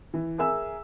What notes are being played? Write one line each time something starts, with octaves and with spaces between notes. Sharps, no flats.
E3
G#4 A#4 E5 G#5 E6